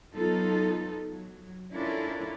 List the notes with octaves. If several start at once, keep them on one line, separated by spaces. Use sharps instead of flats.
F#3 B3 D#4 F4 A4
F#3
C#4 D4 E4 F4 A4 A#4